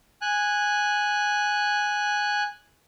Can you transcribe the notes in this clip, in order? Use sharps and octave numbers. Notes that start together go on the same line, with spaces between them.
G#5 F#6